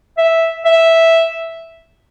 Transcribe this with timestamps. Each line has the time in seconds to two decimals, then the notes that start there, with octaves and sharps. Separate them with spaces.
0.18 E5
0.65 E5